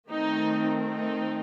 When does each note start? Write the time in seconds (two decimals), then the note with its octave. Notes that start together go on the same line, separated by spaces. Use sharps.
0.10 D#3 A3 C4 D#4
0.91 D#4